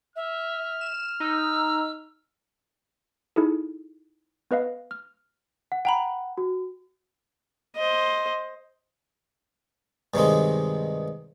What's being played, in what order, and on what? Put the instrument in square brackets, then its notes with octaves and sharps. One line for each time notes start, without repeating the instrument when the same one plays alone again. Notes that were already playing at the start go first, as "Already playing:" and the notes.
[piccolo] E5 [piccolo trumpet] F6
[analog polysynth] E7
[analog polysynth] D#4 [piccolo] E6
[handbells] D#4 E4 G#4 A4
B3 B4 D#5 F5
F6
[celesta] F#5
[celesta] F#5 [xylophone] G5 A#5 B5
[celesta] F#4
[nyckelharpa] C5 D#5
[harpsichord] G2 C3 D#3 G#3